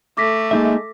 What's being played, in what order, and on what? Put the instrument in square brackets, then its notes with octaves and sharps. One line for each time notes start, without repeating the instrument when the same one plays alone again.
[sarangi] A3 [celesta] D6 A#6 B6
[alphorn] G#3 [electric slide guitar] A#3 D#4 E5